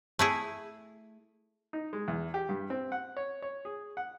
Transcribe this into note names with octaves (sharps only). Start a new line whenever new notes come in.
A3 E4 G#4
D#4
G#3
E2
G4
G2
C4
F#5
C#5
C#5
G#4
F#5